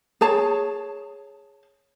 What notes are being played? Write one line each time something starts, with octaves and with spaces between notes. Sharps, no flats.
G#4 C#5 A5